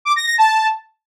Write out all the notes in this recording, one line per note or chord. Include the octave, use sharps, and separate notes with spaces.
D6
A#6
A#6
A5